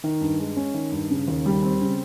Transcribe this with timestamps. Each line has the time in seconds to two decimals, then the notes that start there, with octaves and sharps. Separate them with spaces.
0.04 D#3
0.21 G2
0.39 G#3
0.56 C#4
0.74 D#3
0.92 G2
1.10 C#3
1.28 D#2
1.46 G3
1.63 C4
1.81 C#3